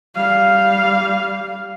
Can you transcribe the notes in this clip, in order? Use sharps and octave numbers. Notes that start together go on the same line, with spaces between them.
G3 F5